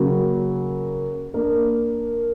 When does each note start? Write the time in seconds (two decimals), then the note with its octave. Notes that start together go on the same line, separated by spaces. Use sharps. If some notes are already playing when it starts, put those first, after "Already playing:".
Already playing: C#3 F#3 A#3
1.34 A#3 D4 A#4